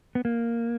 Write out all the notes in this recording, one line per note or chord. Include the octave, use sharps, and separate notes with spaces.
B3
A#3